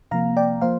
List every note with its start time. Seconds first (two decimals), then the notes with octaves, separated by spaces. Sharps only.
0.11 C3 F3 A#3 F5 A#5
0.37 D5 G5
0.61 F3 A#3 C5 F5